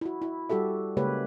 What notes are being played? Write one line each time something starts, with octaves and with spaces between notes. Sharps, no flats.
E4 F#4
E4
G3 F#4 G4 A4 E5
C#3 G#3 A#3 G4 B4 C#5